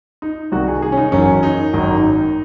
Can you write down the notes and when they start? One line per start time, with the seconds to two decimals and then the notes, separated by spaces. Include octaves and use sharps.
0.22 D#4
0.52 C2 C3 D#3 F#4
0.68 G#4
0.82 G#4
0.92 C#4
0.97 D#4
1.12 F#1 F#2 E3 C#4
1.43 D#4
1.73 G#1 F#2 D#3